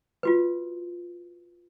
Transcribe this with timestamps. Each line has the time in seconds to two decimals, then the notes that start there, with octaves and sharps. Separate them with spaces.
0.23 F4 F#4 B4